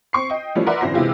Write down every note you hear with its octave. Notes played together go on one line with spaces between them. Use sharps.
C4 C#6 C7
D#5 G5
E3 F3 G3 A3 C#4
A#4 B4 D5 E5 F#5 C6
G1 F#2 E3 C4 C5 A#6
C3 E3 G#3 E4 F4 G4